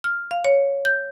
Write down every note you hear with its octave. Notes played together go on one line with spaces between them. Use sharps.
F6
F5
C#5
G6